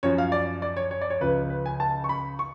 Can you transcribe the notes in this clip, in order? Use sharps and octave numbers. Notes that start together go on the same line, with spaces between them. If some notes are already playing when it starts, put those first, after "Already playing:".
F#2 F3 C#5
F5
D5
D5
C#5
C#5
D5
C#5
C#2 C#3 F3 B4
B4
G#5
A5
C#6
B5
C#6